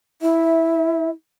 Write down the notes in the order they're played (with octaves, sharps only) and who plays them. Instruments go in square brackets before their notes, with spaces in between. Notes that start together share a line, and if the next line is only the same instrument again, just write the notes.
[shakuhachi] E4 [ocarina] E5